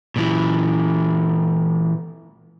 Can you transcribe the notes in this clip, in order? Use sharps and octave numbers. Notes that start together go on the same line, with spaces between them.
A#2 E3